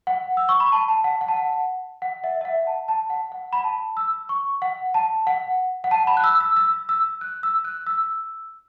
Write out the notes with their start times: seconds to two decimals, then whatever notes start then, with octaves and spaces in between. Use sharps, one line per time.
0.07 F#5
0.37 E6
0.49 C#6
0.60 B5
0.72 A5
0.88 A5
1.04 F#5
1.21 F#5
1.28 A5
1.36 F#5
2.02 F#5
2.24 E5
2.41 E5
2.45 F#5
2.67 A5
2.88 A5
3.10 F#5
3.32 F#5
3.53 B5
3.64 A5
3.97 E6
4.29 C#6
4.62 F#5
4.94 A5
5.27 F#5
5.84 F#5
5.91 A5
6.07 B5
6.17 F#6
6.24 E6
6.40 E6
6.56 E6
6.89 E6
7.21 F#6
7.43 E6
7.65 F#6
7.87 E6